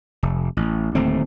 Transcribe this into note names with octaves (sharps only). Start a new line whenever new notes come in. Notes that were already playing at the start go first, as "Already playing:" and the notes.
F1
A1
D1 D#2 A3 C4